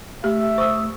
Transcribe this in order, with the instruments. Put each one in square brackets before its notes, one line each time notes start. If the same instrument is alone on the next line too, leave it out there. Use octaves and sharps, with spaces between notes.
[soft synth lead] A3 [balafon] G4 [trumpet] E5
[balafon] C5 [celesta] C#6 D#6 E6